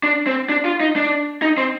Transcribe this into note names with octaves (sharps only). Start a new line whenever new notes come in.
D4
C4
D4
F4
D#4
D4
D#4
C4